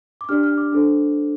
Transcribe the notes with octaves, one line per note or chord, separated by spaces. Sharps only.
D6
D4 G4 D5 F6
F6
D6
D4 A4 C5